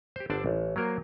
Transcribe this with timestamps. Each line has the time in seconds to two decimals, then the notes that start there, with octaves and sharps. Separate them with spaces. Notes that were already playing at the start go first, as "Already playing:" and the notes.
0.16 G4 C5
0.30 G1 D3 D4 C5 D5 A5
0.46 A1
0.76 F#3 A#3 A#4 C5